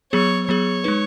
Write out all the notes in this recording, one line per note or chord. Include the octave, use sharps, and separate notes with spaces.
F#3 B3 G#4 C#5
F#3 B3 G#4 C#5
G#3 D#4 B4